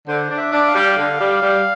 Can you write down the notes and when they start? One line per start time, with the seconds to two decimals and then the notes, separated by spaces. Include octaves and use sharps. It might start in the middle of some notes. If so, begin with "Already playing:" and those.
0.07 D3 C5
0.30 D4
0.37 E5
0.52 D4
0.68 F5
0.75 G3
0.97 D3
1.20 G3
1.42 G3